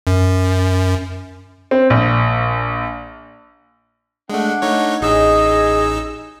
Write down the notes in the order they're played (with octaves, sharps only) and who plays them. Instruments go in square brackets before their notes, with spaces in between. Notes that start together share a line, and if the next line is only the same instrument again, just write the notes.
[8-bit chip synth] F#2
[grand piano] C4
A#1
[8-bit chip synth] G#3 A3 [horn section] D4 F#5
[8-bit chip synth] A3 D#4 C#5
[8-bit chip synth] A1 D#4 E6 [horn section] G#4 D#5